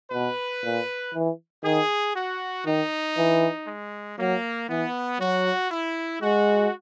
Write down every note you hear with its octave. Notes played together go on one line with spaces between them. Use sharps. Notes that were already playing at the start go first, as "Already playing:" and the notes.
B2 B4
A#2
E3
D#3 G#4
F#4
D#3 D#4
E3
G#3
F#3 A#3
E3 B3
F#3 F#4
E4
G#3 F#4